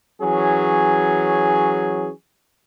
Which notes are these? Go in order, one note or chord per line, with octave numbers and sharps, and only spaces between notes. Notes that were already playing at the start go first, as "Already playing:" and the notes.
E3 F#3 C#4 G#4